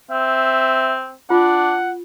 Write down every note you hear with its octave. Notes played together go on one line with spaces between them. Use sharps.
C4 E5
D4 F4 F#5